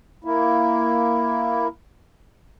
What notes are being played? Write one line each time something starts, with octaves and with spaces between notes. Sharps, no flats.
A#3 E4